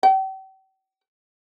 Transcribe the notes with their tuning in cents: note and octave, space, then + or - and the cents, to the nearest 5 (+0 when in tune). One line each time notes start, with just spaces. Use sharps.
G5 -40